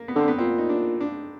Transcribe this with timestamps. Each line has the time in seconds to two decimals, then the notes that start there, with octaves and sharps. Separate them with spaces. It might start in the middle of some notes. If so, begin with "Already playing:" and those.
Already playing: A#3
0.08 B3
0.16 D3 C4
0.28 B3
0.39 A#2 C4
0.58 D#4
0.69 D4
1.01 D4